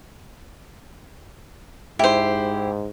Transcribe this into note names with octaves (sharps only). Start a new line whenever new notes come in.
G#2 E4 G4 C5